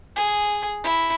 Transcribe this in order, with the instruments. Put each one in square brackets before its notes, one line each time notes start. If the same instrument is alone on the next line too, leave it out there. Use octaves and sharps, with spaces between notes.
[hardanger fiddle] G#4
E4